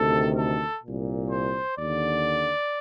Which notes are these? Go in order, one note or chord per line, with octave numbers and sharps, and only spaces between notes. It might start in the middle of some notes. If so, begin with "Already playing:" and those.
Already playing: D2 C3 D#3 A4
A4
C2 A#2
C5
D#2 D3 D5